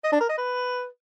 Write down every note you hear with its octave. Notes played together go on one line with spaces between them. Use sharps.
D#5
D4
A#4
D#5
B4